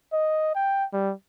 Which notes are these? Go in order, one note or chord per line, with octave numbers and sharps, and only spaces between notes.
D#5
G5
G3